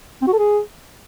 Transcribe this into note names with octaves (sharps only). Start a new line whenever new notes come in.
C4
F#4
A4
G#4